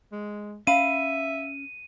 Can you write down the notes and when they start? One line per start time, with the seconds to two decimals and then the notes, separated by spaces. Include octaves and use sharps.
0.12 G#3
0.67 C#4 E5 F5 B5 D#7